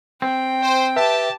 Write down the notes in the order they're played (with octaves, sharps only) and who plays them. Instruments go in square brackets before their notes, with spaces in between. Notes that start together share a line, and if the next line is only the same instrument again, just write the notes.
[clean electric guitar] C4 [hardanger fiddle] G5
[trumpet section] C5
[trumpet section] G4 A5 [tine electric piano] B4 E5